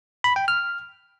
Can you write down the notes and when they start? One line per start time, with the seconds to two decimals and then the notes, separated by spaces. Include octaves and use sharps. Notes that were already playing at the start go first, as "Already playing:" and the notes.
0.24 B5
0.36 G5
0.48 F6